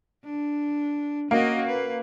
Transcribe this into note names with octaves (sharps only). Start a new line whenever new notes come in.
D4
A#3 C#4 F#4 D#5
B4